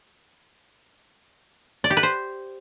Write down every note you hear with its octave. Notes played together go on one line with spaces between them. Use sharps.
D5
G4
B4
C5